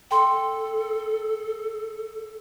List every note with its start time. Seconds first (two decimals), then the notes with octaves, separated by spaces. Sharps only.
0.11 A4 G5 C6